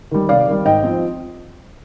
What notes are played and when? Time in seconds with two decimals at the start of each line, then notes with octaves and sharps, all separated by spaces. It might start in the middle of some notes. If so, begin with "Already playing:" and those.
0.11 D#3 G3
0.29 C3 D5 F5
0.48 D#3 G3
0.65 G#2 D#5 G5
0.84 F3 C4